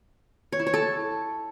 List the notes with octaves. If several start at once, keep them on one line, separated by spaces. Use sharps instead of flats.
C#5
E4
C#5
A4